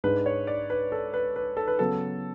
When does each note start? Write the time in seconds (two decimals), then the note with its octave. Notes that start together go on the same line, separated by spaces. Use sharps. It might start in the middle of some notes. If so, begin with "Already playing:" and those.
0.04 G#2 G#3 D4 B4
0.26 C#5
0.47 D5
0.70 B4
0.92 A4
1.14 B4
1.36 B4
1.57 A4
1.68 B4
1.79 C#3 F#3 B3 A4